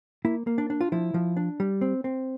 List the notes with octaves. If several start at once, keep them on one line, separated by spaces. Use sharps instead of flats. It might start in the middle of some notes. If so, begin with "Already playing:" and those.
A#3 E4
A#3
D4
D4
F4
F3 E4
F3
D4
G3
C4
C4